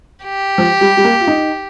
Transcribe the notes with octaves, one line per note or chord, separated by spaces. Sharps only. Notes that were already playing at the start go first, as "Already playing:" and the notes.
G4
F3
G3
G3
A#3
F4
D#4